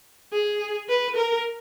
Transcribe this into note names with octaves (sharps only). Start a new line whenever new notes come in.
G#4
B4
A#4